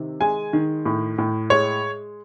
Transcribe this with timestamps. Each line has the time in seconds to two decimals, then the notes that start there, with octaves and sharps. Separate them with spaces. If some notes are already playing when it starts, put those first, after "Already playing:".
Already playing: C3 D#3
0.21 G#3 G#5
0.53 D#3
0.85 A2
1.18 A2
1.50 G#3 C#5